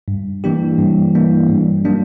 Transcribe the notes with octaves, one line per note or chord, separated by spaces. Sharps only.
G2
E3 A#3 D4 G4
G2
E3 A#3 D4 G4
G2
F#3 A#3 D4